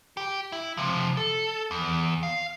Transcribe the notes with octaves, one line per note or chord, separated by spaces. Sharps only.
G4
E4
C3 F3
A4
E2
F5